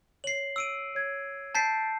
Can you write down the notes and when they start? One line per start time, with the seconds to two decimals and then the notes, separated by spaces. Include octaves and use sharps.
0.24 C#5 C7 F#7
0.56 E6 D7 D#7
0.95 C#5 G#6
1.55 A5 G6 A6 B6 C7 D7